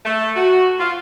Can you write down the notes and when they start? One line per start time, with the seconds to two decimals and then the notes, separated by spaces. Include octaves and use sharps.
0.05 A3
0.36 F#4
0.80 F4